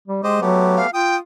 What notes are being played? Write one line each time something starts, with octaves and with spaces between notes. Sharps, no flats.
G3
G#3 G4 C5 D#5
F#3 A3 B3 G4
F5
F4 G5 D#6